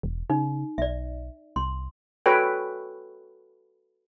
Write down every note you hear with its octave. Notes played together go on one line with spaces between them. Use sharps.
E1
C#3 D#4
B1 D5 E5
C2 C6
F#4 A4 B4 C#5 G5